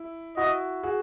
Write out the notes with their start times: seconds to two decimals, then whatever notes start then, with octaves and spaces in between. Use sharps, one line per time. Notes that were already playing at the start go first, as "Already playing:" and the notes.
Already playing: E4
0.37 E4 F#4 D#5
0.83 F#4 G#4